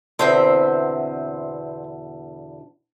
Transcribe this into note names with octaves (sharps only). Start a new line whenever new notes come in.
E2 B2 D3 C4 C5 E5